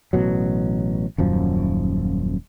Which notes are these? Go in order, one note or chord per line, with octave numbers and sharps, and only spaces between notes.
A1 B2 F#3
D#1 F#2 F3